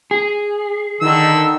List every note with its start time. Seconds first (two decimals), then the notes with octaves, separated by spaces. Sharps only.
0.11 G#4
1.01 D3 D#3 D#4 E6